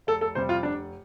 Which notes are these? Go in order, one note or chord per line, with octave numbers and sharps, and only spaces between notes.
F1 A4
A4
F2 C3 G3 C5
F4
F1 D4